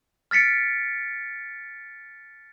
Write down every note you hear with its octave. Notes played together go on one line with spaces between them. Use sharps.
F6 A6 B6 C#7 D7